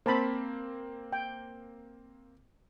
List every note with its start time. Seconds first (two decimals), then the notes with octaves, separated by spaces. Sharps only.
0.06 A#3 C4 C5 A5 B5
1.13 G5